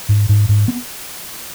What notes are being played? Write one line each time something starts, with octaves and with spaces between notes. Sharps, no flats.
G#2
G#2
G#2
B3